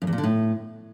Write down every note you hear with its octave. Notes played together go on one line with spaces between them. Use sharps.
F#2
E2
A#2
D3
A2